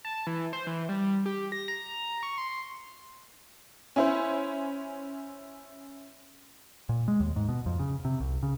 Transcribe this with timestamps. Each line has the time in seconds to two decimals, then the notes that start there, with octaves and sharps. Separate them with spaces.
0.05 A5
0.27 E3
0.53 C5
0.67 E3
0.89 G3
1.26 G4
1.52 A#6
1.68 A#5
2.23 C#6
2.38 C6
3.96 C#4 E4 C5
6.89 A#2
7.08 G#3
7.20 D#2
7.36 G#2
7.49 B2
7.66 F2
7.79 C#3
8.05 C3
8.20 C2
8.43 C#3